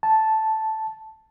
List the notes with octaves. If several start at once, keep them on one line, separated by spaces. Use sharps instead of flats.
A5